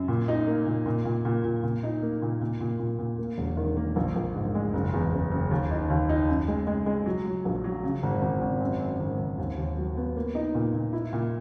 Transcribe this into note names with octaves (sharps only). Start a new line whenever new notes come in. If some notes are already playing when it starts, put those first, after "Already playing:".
Already playing: F#2
A#2
D#4
A#3
A#2
A#2
A#2
A#2
A#2
A#2
D#4
A#3
A#2
A#2
A#2
A#2
A#2
A#3
E1
D#3
A#3
A#1
A#1
G#2
G#3
F#1
E2
F#1
F#1
D#2
D#4
D#2
D#4
F#2
G#3
G#3
G#3
F#3
F#3
A#1
F#3
C#3
G#1
G#1
G#1
F#2
F#2
G#1
G#1
D#2
D#2
F#3
B3
A#3
D#4
A#2
A#2
E4
A#2